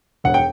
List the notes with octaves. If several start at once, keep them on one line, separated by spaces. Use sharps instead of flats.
E1 F#5
G5